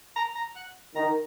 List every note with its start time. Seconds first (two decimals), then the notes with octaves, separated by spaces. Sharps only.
0.16 A#5
0.35 A#5
0.56 F#5
0.96 D#3 A#5